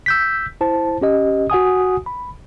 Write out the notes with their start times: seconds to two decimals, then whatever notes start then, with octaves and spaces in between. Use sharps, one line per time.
0.06 E6 G6 B6
0.61 E4 C5 A5
1.01 C#4 G4 D#5
1.50 F#4 F#5 G#5 D#6
2.06 B5